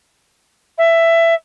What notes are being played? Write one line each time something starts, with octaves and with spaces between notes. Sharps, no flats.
E5